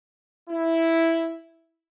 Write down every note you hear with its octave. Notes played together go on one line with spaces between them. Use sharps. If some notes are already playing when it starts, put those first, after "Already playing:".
E4